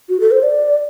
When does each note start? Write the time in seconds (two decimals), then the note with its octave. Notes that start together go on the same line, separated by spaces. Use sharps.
0.09 F#4
0.20 A4
0.31 C5
0.43 D5